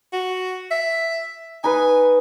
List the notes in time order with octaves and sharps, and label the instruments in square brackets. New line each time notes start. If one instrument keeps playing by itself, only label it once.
[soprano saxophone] F#4
E5
[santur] D#4 B4 [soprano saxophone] G#5